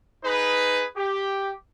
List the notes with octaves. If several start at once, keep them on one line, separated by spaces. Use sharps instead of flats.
D#4 G#4 B4
G4